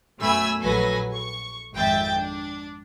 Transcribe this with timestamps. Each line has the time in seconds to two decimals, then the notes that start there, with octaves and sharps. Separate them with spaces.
0.20 F#2 B2 A3 G#5 B5 E6
0.60 A#1 F#3 A4 B4 G#5 A#6
1.13 C#6
1.74 G#1 F2 E5 G5 A6
2.15 D4